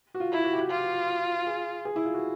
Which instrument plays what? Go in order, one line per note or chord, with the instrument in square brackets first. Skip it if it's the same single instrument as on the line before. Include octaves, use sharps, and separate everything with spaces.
[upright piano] F#4
F4
[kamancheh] E4
[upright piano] F#4
G4
F#4
[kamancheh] F4 [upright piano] G4
[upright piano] G#4
G#4
E4
F4
F#4